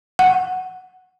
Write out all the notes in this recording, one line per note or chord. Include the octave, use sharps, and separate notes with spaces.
F#5